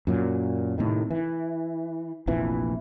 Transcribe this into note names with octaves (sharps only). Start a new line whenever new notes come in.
F#2 A#2 F#3
A2 C3 D#3
E3
F1 A#1 F2 E3